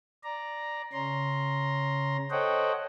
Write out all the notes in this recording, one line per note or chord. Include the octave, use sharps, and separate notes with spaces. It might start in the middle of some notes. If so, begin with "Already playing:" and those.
D5 A#5
C#3 C#4 A#5 C6
A4 C5 C#5 D#5 F#5 G5